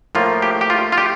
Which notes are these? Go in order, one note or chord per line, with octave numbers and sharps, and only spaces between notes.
A2 F3 A#3 F4
G4
G4
F4
F4
G4